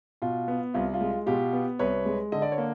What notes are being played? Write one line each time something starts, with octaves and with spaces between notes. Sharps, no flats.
B2 F4
B3
C2 F4
F4
G#3
B2 F4 G4
B3
C2 B4 C#5
G#3
D3 D#5
D5
C#5
A#3